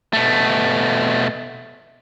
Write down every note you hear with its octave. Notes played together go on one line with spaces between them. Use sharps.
B2 A3